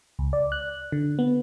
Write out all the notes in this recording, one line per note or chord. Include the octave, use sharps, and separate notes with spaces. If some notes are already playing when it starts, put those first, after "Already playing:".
C#2
D5
F#6
D3
B3